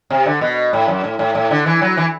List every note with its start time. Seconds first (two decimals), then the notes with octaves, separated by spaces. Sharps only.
0.10 C3
0.26 D3
0.41 B2
0.73 A2
0.88 F#2
1.04 A2
1.19 A2
1.35 A2
1.51 D3
1.66 E3
1.82 F#3
1.97 E3